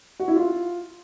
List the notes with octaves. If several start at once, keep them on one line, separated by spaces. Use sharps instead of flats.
F#4
E4
F4